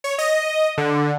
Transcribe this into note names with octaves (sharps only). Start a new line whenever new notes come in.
C#5
D#5
D3